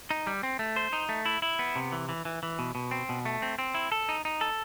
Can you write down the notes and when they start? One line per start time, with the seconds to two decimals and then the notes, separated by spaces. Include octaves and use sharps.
0.11 D#4
0.27 G3
0.43 C4
0.59 A3
0.76 C5
0.93 D#4
1.09 A3
1.25 E4
1.42 E4
1.59 B3
1.76 C3
1.92 E3
2.09 E3
2.25 E3
2.43 E3
2.59 B2
2.75 B2
2.91 C4
3.09 B2
3.25 A3
3.42 C4
3.59 C4
3.74 E4
3.92 A4
4.09 D#4
4.25 D#4
4.41 A4